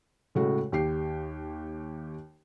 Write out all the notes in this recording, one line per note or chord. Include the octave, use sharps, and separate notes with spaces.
A2 C#3 G#3 A3 F#4
D#2 G4 C7